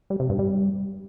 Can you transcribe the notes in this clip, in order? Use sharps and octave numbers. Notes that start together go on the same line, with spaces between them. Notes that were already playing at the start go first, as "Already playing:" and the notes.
G3
C3
G2
G3